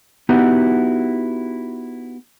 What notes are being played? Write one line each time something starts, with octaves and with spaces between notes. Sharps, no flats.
B3 D#4 E4 F#4 G4 B4